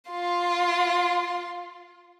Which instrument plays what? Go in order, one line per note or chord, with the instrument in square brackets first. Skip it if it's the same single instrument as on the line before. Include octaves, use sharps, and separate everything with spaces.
[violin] F4 C6